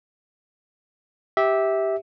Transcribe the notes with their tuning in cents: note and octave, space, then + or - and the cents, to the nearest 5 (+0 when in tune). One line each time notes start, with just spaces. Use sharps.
G4 +0 E5 -15